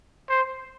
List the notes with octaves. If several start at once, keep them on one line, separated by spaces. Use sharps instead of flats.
C5